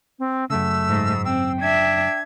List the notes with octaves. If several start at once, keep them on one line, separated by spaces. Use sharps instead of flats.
C4
F#2 C#3 A3 E6
G#2
C4 G5 E6
D4 E5 G#6